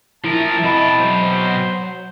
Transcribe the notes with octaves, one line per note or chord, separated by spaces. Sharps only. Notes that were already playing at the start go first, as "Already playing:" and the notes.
F3 E4 A#4 A5
B2 C4 D#5 G5 B5
F#3 C5